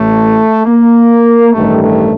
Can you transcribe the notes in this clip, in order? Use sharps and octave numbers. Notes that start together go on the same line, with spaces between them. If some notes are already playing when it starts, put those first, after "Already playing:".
Already playing: A1 A2 A3
A#3
A1 G2 D#3 A3
A3